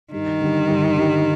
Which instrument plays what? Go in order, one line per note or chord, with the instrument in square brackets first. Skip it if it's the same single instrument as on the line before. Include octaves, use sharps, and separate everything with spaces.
[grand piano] G2 [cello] D#3
[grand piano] D3 G3
G2
D3 G3